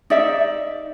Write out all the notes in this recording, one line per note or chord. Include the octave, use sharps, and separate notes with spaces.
D#4 D5 E5